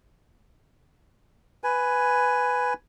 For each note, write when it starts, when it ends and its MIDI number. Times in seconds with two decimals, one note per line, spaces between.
1.64 2.74 71
1.64 2.74 80